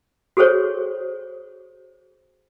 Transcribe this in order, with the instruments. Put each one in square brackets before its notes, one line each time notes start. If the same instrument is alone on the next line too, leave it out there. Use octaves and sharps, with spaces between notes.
[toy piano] F#4 G#4 A4 C5 C#5